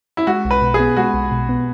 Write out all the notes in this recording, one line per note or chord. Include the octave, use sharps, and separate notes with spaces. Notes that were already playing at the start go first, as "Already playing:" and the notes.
E4
G#3 F#4
B1
B4
B2
G#4
B3
G#3 F#4
B1
B2
B3